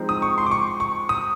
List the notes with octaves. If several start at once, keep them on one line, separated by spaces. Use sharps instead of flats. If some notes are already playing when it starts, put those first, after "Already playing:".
Already playing: F3 G#3 C4 D#4
D#6
C#6
C6
D6
C#6
C#6
D#6